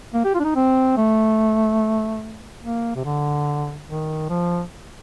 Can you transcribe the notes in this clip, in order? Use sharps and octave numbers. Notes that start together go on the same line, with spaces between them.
A#3
G4
F4
D4
D#4
C4
A3
A#3
C3
D3
D#3
F3